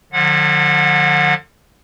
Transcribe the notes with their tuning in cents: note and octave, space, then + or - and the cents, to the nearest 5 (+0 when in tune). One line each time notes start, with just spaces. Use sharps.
D3 +40 F3 +45 F#5 -30